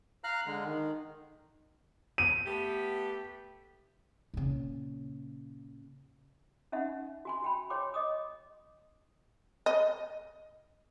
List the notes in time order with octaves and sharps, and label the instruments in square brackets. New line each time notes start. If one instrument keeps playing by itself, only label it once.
[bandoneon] F5 A#5 F6 F#6
D3 G#3
D#3
[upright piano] D#7
[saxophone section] A3 B3 G4
[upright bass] A#2 C#3
[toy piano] C#4 D#4 E5 F#5
F#4 G#5 C6
F#4 G5 B5
C#5 G5 C6 D6
D#5 D6 D#6
[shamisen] D#5